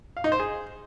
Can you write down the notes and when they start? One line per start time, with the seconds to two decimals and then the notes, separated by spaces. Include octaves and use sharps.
0.17 F5
0.24 D#4
0.32 C5
0.39 G#4